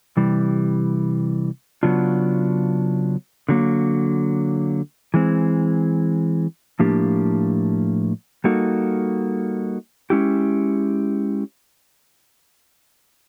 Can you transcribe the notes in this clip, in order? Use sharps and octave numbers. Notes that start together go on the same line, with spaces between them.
C3 E3 G3
C#3 F#3 B3 D4 F4
D3 F#3 A#3
E3 G#3 C4
A2 F3 A#3 D4 G4
G3 A#3 D#4 F#4 A4
G#3 C#4 E4 G4